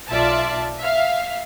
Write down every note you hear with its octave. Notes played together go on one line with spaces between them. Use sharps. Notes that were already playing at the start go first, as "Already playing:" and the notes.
B1 F4 D5 E5 A5
E5 F5